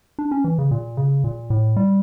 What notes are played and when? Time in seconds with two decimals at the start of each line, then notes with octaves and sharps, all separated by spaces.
0.19 D4
0.31 C#4
0.44 E3
0.58 C#3
0.71 A#2
0.97 C#3
1.24 A#2
1.50 A2
1.76 G3